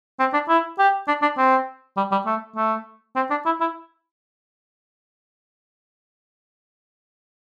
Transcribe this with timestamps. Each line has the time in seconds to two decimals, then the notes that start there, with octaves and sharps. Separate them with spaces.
0.19 C4
0.33 D4
0.49 E4
0.79 G4
1.08 D4
1.22 D4
1.38 C4
1.97 G3
2.12 G3
2.26 A3
2.56 A3
3.16 C4
3.31 D4
3.46 E4
3.61 E4